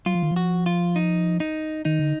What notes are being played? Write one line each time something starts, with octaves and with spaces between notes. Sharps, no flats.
F#3 F4
F3
D#3
F3
F#4
F4
D#4
D#4
D#3 D#4
D3